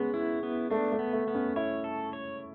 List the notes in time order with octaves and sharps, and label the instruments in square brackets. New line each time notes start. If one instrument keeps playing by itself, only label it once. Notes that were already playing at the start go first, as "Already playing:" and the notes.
Already playing: [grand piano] G#3 C#4 [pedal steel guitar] B3
[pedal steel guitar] E4
B3
[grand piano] A3 [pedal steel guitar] D4
[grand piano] A3
[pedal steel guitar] B3
[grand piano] A3
[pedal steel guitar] B3
[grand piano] C#4
[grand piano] E4 [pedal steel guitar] C#5
[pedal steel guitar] A4
C#5